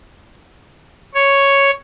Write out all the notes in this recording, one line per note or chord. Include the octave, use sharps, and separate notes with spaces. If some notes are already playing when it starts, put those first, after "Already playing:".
C#5